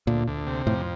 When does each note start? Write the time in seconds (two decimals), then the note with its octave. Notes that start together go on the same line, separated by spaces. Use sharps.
0.07 D2 A#2
0.27 D2
0.47 C3
0.66 F2 A2